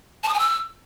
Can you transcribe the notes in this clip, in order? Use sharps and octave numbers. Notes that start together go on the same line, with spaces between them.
A5
D#6
G#5
E6